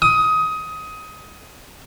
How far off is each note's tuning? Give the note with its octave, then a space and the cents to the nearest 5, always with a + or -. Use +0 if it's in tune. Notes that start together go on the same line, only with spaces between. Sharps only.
D#6 +20